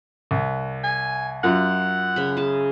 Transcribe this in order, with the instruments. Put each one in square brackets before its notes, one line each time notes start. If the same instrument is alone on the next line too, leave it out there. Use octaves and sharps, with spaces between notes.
[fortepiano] C2
[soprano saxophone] G#5
[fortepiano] F#2 [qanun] F4 [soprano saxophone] F#5
[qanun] C#3 B5
G#4 A5